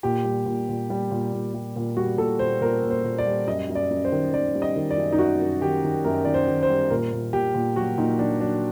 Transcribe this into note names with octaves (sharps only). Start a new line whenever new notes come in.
A#2 G4
G3
A#2
A#2
G3
A#2
A#2
G3
A#2
G3 F#4
A#2 A4
A#2 C5
A#2 A#4
A#2
C5
A#2
D5
G3
F#2 D#5
F#2
D5
F#2
C5
D#3
D#3 D5
G3
D#5
D#3
D5
F#2
D#4
F#2 F#4
F#2
D#3 G4
D#3
F#2 A#4
D#3 D5
C5
D#3
C5
G3
A#2 A#4
A#2
A#2 G4
A#2
F#3 F#4
A#2 D#4
F#3 D4
F#3 D4